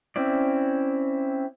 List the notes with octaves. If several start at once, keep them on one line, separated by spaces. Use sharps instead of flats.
C4 C#4 E4 D5